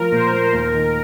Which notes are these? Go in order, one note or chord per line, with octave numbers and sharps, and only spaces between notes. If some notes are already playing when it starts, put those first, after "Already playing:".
Already playing: F3 F4 A#4
A#2 C5
A#3
D#2 A#4
D#3